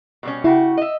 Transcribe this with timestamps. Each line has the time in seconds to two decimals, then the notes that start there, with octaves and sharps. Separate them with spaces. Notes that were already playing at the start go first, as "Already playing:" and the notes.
0.23 B2 G3 C#4
0.44 C#3 E4 F#4 G4
0.78 D#5 E5